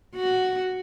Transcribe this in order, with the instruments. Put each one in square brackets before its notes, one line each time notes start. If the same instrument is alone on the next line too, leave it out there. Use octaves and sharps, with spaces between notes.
[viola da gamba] F#4